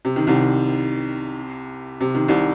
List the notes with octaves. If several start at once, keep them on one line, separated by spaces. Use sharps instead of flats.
C3
D#3
C2 C3
C3
D#3
C2 C3